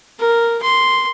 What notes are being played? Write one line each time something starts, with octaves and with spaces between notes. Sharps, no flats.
A#4
C6